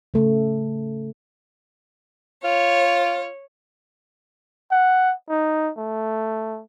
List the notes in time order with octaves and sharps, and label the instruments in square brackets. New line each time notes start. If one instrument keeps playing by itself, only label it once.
[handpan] C#3 A3
[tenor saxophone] F4 [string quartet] C#5
[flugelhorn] F#5
D#4
A3